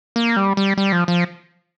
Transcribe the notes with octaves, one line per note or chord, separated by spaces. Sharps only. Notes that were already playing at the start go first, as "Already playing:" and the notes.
A#3
G3
G3
G3
F3
F3